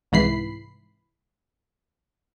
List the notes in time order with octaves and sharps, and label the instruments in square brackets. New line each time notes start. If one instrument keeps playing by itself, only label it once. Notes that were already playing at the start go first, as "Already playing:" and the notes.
[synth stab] C2 G#2 E3 B5 C7